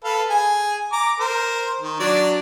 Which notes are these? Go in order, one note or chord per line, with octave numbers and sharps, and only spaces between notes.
A4 B4 F5
G#4 G#5
A#5 D6
A#4 C5
D#3
F#3 D4 D5